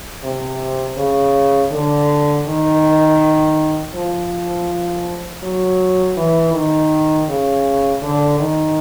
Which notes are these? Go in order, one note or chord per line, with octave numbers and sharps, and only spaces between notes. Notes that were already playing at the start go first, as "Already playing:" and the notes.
C3
C#3
D3
D#3
F3
F#3
E3
D#3
C#3
D3
D#3